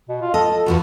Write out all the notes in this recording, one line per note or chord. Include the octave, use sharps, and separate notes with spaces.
B2
F4
A4 D#5
E2 D#3 F4 F#4